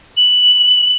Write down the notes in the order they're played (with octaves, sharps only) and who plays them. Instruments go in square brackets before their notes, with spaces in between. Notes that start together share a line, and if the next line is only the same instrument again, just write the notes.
[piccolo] F#7